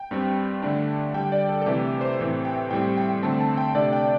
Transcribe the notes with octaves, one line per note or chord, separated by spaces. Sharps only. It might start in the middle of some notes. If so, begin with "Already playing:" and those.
Already playing: G5
G2 G3 C4
D3 A3 D4
D3 G3 D4 G5
D5
A4
A4
C3 E3 A3 G4
C5
A2 E3 C4
G5
A2 G3 C4 G5
G5
D3 A3 C4 A5
A5
G5
C3 A3 D4 D5
G5